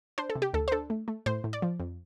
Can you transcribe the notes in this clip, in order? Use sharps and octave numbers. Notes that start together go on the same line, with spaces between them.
D4 C5
A4
C3
G4
D2 A4
C5
D4 A4
A3
A3
A2 C5
A2
D5
F3
F2